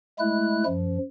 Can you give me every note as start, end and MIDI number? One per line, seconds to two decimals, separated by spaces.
0.19 0.64 56
0.19 0.64 57
0.19 0.64 64
0.19 0.64 90
0.66 0.98 42
0.66 0.98 53